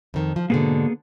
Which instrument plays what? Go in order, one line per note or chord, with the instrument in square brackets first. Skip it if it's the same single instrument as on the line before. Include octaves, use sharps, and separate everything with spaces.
[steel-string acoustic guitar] F2 D#3
F3
[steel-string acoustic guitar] G#2 B2 D3 [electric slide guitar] A#3 B3 G#4